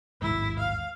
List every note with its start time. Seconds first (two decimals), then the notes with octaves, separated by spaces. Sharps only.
0.22 A1 D#2 G#2 E4
0.59 F5